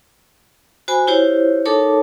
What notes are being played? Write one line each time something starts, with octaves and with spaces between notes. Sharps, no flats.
F#4 C5 G#5 B5
E4 F4 G4 C5 C#5
D#4 A4 A#4 C#5 A5 D6